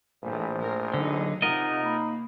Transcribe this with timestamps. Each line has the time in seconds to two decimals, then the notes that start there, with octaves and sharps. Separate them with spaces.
0.23 A#1 A2 E3 C5
0.63 A#4
0.94 D3 F#3 D#4
1.42 C3 D#4 F4 A#4 D#5 F#5
1.85 A#3 B5